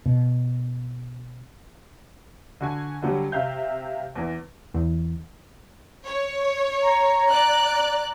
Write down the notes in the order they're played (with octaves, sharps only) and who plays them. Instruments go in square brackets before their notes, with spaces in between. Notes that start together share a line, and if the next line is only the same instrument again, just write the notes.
[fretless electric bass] B2
[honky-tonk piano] D3 F#4 G#5
D3 F#3 G3
C3 E5 F5 G6
E2 E3
[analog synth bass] E2
[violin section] C#5
[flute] A#5
[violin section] D5 F#6